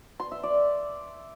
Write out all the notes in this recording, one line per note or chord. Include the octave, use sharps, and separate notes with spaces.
C6
E5
D5